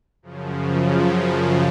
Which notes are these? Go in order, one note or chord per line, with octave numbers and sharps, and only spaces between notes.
F#2 C#3 F3